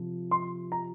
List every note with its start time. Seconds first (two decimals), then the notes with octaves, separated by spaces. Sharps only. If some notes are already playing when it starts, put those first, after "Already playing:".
Already playing: C3 F3
0.31 C6
0.72 A#5